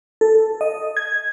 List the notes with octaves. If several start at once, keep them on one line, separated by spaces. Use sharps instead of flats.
A4
D#5
G#6